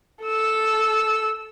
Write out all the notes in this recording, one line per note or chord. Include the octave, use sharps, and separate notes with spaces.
A4 E6